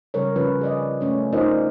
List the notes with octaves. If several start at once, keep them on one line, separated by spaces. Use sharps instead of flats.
C#3 G3 A#4 C#5
C#3 F3 C#4 F4 B4 C#5
G#4 D5 D#5
A3 C#4 C#5
D#4 F4 A#4 C5 D5 D#5